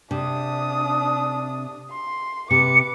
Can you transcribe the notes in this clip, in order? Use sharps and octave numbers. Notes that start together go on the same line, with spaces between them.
C3 D4 D#6
C6
C3 B4 D6 C#7